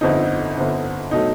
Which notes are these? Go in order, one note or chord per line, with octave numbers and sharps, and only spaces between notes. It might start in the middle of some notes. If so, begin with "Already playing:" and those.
G1 F2 D3 D#4
G1 F2 D3
B2 F#3 A3 D#4